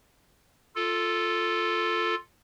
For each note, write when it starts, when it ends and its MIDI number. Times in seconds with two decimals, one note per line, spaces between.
0.76 2.15 65
0.76 2.15 69